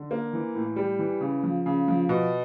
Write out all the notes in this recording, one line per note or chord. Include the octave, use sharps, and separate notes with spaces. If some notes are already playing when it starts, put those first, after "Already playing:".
Already playing: D3
A#3
E3
A2
G3
E3
C#3
F3
C#3
F3
B2